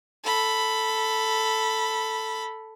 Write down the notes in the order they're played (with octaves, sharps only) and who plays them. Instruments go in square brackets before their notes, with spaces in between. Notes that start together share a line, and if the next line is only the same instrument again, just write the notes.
[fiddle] A4 B5